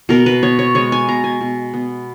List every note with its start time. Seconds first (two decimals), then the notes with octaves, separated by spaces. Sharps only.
0.09 B2 A#4
0.26 B4
0.43 B3 C#5
0.59 C#5
0.75 G#3 C#5
0.92 G#5
1.08 B2 A#5
1.24 G#5
1.41 B2
1.74 B3